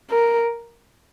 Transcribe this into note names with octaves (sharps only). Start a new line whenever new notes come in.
A#4